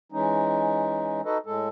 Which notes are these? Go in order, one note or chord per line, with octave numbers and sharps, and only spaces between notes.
E3 G#3 C#4 D#4
D#4 F#4 A4 B4 D#5
A2 G#3 A4